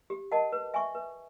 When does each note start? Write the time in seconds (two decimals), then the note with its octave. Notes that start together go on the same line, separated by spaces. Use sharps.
0.10 G4
0.32 A#4 D#5 F#5 A5
0.52 B4
0.74 E5 G#5 C#6
0.95 B4